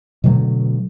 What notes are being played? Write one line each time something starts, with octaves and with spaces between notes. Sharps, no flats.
B2 D3 F#3 A3